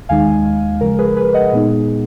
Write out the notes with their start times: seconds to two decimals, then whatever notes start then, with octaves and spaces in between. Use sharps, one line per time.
0.09 D#2 D#3 G#3 D#4 F5 G#5
0.81 C#3 F3 G#3 A#4
0.99 G#4 B4
1.16 G#4 B4
1.34 D#5 F#5
1.53 A#2 G#3 B3 D#4 G#4